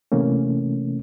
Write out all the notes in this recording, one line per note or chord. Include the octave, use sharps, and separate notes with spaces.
C3 E3 A3 A#3 C#4